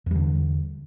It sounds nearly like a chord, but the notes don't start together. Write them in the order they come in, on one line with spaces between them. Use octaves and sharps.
E2 G3 D3